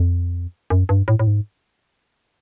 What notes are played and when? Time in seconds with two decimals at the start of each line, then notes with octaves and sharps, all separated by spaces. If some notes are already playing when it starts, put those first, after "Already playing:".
Already playing: F2
0.70 F#2
0.89 G2
1.08 A2
1.19 A2
1.27 G#2